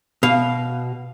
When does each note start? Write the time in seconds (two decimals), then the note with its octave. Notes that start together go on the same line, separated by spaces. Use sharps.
0.23 B2 F5